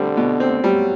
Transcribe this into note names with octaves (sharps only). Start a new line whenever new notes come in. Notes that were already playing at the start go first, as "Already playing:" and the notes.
Already playing: D3 G3 C4
B2
C4
F#3 G3